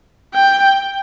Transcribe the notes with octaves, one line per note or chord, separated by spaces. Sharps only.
G5